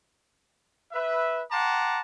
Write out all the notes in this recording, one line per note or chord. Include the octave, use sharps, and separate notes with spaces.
B4 E5
F#5 G5 A5 A#5 C6 D6